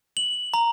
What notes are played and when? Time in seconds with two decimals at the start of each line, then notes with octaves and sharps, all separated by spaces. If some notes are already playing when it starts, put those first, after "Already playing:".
0.17 F#7
0.54 A#5